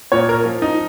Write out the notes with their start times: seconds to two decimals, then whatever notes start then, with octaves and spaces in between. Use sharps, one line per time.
0.12 A#2 C#5
0.29 A#4
0.45 F3
0.62 D#4